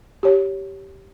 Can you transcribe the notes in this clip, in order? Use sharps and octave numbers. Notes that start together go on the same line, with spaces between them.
G4 C#5